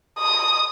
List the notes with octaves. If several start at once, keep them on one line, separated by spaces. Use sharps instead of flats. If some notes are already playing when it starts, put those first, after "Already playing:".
D#6